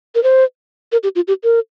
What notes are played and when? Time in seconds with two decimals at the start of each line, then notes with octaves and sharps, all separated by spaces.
0.15 A#4
0.24 C5
0.92 A#4
1.03 G4
1.16 F4
1.28 G4
1.44 A#4